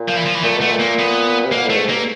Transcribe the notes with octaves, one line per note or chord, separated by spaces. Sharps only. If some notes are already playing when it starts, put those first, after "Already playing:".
Already playing: A#2
F3
E3
F3
E3
A#2 A3
B2
A3
A#2
A#3
B3
C3
B2 A#3
A2
A3
G#2
G2 A#3